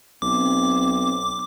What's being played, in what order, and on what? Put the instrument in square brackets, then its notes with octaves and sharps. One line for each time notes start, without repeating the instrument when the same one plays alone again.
[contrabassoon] B1 [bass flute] C4 [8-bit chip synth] D6